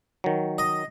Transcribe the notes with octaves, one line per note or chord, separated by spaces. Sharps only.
D#3 F#3
D#5